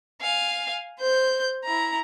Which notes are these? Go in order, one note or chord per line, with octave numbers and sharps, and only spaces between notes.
F5 G#5
C5 G6
E4 A#5